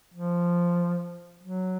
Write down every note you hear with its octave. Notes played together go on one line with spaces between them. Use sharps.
F3
F#3